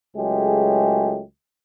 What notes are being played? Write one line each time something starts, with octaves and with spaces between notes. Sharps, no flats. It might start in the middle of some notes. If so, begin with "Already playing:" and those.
C#2 F#3 G#3 A3 G4 G#4